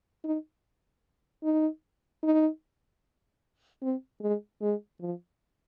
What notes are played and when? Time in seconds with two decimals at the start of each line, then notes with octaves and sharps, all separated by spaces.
0.24 D#4
1.43 D#4
2.23 D#4
3.82 C4
4.21 G#3
4.61 G#3
5.01 F3